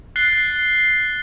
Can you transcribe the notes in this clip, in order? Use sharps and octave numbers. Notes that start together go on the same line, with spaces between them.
F#6 A6 C7 G7